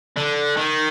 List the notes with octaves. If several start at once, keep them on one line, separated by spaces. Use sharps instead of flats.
D3
D#3